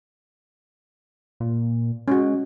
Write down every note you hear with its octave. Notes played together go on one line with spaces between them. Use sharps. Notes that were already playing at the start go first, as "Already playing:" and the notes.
A#2
G#3 C#4 F#4